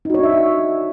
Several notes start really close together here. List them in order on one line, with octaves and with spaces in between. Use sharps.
D#4 F#4 C#5 D4 E5